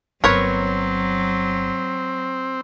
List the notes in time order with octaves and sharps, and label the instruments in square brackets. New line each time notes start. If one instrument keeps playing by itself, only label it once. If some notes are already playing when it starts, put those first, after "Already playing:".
[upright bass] G1 [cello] F#3 [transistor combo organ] C4 [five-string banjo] A#4 B4 C#5